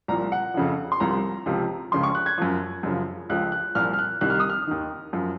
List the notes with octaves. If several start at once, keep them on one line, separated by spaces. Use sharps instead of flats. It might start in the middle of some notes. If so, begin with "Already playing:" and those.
C2 A#2 F3 A#5
F#5
F2 C#3 F3
C6
C2 C3 F3 A#5
C#2 C3 F3
C#2 C#3 F3 C6
C#6
F#6
G#6
F#2 F3
F#2 C#3 F3
C#2 C#3 F3 F#6
F#6
C2 A#2 F3 F6
F6
F#6
C2 C3 D#3 F#6
F6
D#6
F6
D#2 D#3
F#2 F3